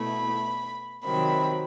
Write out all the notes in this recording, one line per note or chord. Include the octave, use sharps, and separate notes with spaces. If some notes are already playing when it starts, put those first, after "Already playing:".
Already playing: B2 A3 E4 B5
C3 D#3 F#3 C4 B5